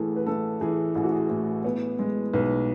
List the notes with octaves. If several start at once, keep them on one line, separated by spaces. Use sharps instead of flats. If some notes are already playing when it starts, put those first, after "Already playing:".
Already playing: A1 A2 E3 G#4 A4
B4
A3 A4
E3 G#4
A1 G#4
F#4
G#4
A2
B3
G#3
B1 B4